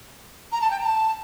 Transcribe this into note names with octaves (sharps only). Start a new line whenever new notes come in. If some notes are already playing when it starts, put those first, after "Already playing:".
A#5
A5
G5
A#5
A5